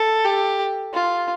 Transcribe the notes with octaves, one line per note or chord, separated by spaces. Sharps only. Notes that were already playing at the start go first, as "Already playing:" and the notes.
Already playing: A4
G4
F4